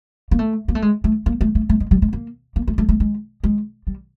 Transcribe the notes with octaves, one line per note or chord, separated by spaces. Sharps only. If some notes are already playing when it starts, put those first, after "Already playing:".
A#3
A3
A#3
A3
G#3
A3
A#3
A3
A3
A3
G#3
G3
G#3
A#3
A#3
A3
A3
A3
G#3
G#3
G3